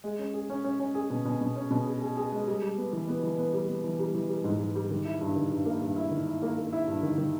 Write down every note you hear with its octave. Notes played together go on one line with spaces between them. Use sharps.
G#3
C#4
G#4
C#4
C#4
C#4
G#4
B2
B2
B2
C#4
B2
G#4
G#4
G#4
G#3
G3
G3
B3
E3
B3
E3
B3
G3
B3
E3
G3
E3
G3
G#2
G#2
G3
D#3
E4
G2
D#3
G2
A#3
G2
E4
D#3
E4
A#3
A#3
E4
G2
D#3
D#3